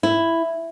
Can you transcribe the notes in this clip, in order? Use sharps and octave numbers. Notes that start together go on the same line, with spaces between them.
E4